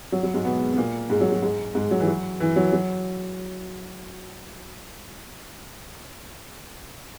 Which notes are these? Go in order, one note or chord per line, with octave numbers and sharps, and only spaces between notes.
F#3
F#3
G#2 G#3
B2 B3
B3
A#2 A#3
G#2 G#3
F#3
F#3
G#2 G#3
G#2 G#3
F#3
E3
F#3
E3
F#3
F#3